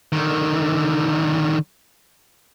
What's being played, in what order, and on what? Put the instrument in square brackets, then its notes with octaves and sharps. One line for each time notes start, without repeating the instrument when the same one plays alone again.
[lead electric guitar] D3 D#3